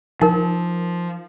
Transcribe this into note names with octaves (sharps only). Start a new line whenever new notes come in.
F3 D#4 A#4